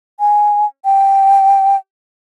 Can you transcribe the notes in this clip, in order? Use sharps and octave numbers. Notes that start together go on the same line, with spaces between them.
G#5
G5